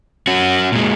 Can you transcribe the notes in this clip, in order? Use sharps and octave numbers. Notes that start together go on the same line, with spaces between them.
C#4 F#4
A#2 G#3